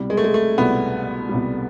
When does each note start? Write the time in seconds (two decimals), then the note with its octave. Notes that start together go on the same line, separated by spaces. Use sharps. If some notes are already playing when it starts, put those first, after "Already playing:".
Already playing: C2 B2 G3
0.10 G#3
0.17 A3
0.24 G#3
0.34 A3
0.58 C2 B2 G3 B3
1.29 C2 B2 G3